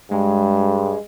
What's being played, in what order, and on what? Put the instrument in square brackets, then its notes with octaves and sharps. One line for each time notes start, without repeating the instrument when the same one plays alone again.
[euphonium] G2 [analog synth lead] G#3